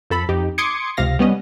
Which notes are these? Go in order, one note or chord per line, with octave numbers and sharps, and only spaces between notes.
F2 A4 B5
F2 D#4 G4
C6 D6 D#6 G#6 C#7
C#2 C3 F5 A#6
G3 B3 C#4 D#5